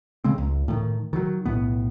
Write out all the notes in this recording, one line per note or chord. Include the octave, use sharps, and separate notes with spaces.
C#3 G#3 C4
C#2
A2 D#3
D#3 F#3
B1 A2 B3